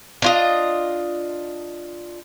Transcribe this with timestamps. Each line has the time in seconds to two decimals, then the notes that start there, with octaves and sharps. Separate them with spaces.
0.22 D4 F4 D#5